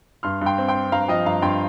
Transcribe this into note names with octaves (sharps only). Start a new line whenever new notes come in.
G2 C6 F6
G2
G5 C6
C4
G5 C6
C4
G2 F5 A#5
F3 D#5 G5
G2 F5 A#5
G2 G5 C6